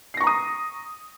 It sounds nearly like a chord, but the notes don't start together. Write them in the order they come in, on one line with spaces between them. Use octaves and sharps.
C7 A#6 C#6 A#5 D#6